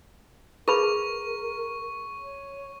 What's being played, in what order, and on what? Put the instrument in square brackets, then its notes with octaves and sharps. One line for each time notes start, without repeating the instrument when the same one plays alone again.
[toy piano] G#4 B4 B5 [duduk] A#4 [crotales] C#6
[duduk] C#5